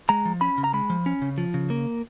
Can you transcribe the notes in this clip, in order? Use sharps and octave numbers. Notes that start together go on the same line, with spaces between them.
G#3 A#5
F3
C#4 B5
C#3
A#5
G#3 B5
F3
C#4
C#3
F3
C#3
A#3